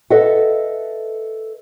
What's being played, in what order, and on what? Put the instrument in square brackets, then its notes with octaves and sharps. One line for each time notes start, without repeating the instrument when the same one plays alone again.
[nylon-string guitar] A4 B4 D#5 E5 F#5